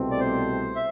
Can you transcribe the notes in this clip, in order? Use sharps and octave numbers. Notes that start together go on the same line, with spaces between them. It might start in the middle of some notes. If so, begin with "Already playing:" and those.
Already playing: C2 B2 A3 C4
D5
C5
E5